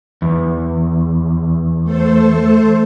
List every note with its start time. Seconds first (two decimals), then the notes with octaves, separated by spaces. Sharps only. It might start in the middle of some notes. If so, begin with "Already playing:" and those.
0.22 E2
1.83 A3 A4 C5